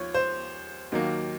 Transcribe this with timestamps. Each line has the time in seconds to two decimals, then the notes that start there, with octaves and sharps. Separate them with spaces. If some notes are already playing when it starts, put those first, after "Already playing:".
Already playing: D#2 F3 C#5
0.14 C5
0.92 D#2 D#3 F#3 A#3